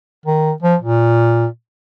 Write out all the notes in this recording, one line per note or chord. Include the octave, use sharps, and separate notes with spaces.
D#3
F3
A#2